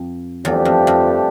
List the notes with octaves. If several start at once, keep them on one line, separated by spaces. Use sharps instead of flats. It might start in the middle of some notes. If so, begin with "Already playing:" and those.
Already playing: F2
E2 G2 F3 A3 D4 G4
F2
F2